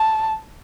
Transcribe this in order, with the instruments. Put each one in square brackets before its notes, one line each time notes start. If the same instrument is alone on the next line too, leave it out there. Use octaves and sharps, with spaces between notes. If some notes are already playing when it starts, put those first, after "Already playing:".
Already playing: [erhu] A5